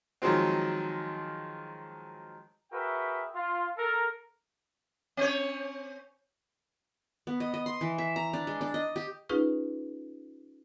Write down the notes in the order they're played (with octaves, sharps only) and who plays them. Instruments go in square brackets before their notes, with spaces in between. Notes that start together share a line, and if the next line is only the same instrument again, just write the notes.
[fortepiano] D#3 F3 F#3 G#3 C4
[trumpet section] F#4 G#4 A#4 B4 E5 G5
F4
A4 A#4
[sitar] C4 C#5
[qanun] B3
D#5
D#5
C6
E3
E5
A#5
D4
G#3
D4
D#5
G4
[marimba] C#4 D#4 F4 G#4 B4